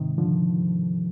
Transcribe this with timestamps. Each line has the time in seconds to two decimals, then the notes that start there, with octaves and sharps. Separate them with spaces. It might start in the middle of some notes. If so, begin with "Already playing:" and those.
Already playing: G#2 C3 D#3
0.18 D3 F3